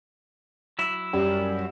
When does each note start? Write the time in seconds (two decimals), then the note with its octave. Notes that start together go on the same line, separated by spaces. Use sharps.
0.79 F#3 E4
1.13 F#2 G3